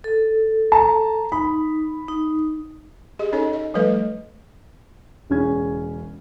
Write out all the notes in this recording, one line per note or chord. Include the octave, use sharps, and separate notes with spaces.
A4
A5 A#5
D#4 B5
D#4
G4 G#4 D#5
C#4 D#4 A4 C#5 D#5
D#5
F3 G3 A3 A4 B4 D#5
E1 C#3 C#4 G#6